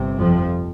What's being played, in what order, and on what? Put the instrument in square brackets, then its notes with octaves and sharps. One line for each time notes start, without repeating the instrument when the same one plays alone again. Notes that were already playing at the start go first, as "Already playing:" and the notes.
Already playing: [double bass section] G1 C3
F2 F3